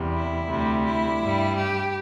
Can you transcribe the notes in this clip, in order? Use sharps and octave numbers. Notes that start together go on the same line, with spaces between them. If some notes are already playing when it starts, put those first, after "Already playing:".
Already playing: E2 C3 G3
E4
D2 C3 G3
E4
G2 G3
G4